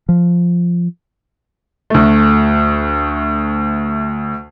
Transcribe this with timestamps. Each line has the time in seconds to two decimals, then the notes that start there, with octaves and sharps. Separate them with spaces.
0.09 F3
1.90 D2 A3